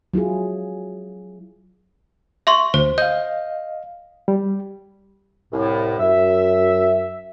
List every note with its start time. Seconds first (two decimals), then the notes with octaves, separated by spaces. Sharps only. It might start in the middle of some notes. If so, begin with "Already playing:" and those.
0.14 F#3 E4 F4 G#4
2.47 E5 C6 C#6
2.74 D2 C5
2.98 D#5 F5 G6
4.28 G3
5.53 C2 A2
5.99 F#2 E5